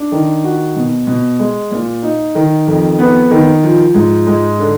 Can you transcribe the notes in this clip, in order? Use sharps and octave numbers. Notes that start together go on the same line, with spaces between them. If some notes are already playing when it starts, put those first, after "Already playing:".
Already playing: D4
D#3
F#4
B2
B2
G#3
A#2
D#4
D#3
F2
B3
D#3
F3
G#2
G#3
D3